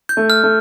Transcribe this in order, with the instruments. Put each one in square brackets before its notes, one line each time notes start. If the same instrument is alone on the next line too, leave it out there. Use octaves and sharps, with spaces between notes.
[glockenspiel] G6
[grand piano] A3
[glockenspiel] F6
[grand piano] A3